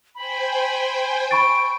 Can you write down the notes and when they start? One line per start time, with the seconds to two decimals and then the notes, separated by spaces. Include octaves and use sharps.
0.15 C5 G5 G#5 B5
1.31 B5 C#6 A6 D7